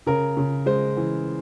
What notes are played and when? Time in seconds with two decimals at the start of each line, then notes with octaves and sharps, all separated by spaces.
0.06 C#3 A#4
0.37 C#3
0.66 G#3 C5
0.97 E3